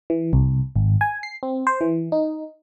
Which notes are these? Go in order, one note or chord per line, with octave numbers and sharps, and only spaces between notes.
E3
C2
G#1
G#5
C7
C4
C5
E3
D#4